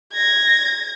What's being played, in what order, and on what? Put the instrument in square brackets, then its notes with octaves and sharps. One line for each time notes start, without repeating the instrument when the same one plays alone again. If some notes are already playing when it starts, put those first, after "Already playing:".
[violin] G#6 A#6